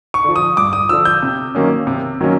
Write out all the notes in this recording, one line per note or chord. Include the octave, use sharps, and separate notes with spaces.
C#6
D3 F3
D#6
G2 D6
D#6
D3 F3 E6
G6
C3
D#3 F#3 A#3 C#4
C3
D#3 F#3 A#3 C#4